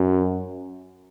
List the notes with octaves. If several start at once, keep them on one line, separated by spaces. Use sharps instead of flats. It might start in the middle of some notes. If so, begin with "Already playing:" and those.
Already playing: F#2